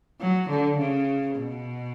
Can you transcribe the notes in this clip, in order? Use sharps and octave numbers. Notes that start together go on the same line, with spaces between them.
F#3
D3
C#3
B2